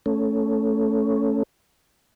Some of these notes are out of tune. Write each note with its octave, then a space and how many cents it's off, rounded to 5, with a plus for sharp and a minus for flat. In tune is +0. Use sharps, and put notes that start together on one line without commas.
A3 +0 C#4 +0